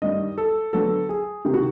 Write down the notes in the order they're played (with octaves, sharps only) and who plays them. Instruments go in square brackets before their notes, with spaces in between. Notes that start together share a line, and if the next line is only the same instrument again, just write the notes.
[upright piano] G2 D#3 G3 [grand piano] D#5
[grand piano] A4
[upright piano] D3 F#3 B3 [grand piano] A4
[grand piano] G#4
[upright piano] C#2 C3 D#3 [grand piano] G4
[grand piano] F#4